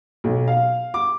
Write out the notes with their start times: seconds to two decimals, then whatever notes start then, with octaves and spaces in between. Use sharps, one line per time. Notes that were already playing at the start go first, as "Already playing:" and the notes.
0.24 B1
0.48 F5
0.94 D6